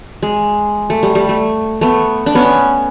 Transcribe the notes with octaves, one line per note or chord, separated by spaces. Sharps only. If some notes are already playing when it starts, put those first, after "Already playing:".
G#3
A3
G3
G3
A3
A3 B3
D4
B3 C#4